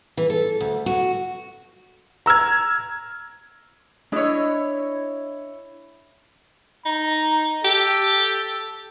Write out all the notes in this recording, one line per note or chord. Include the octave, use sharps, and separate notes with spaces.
E3
A4
D2
F#4
A#5 E6 F6 G#6
D4 E4 C#5 D#5
D#4 A#5
G4 A4